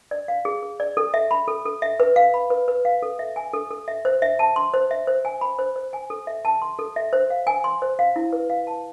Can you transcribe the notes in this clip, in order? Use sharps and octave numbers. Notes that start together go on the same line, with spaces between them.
D5
F5
G#4
G#4
D5
A4
E5
B5
A4
A4
E5
B4
F5
B5
B4
B4
F5
A4
E5
G#5
A4
A4
E5
C5
E5
A5
C6
C5
E5
C5
G#5
B5
C5
C5
G#5
A4
E5
A5
C6
A4
E5
C5
F5
G#5
C6
C5
F5
E4
B4
F5
A5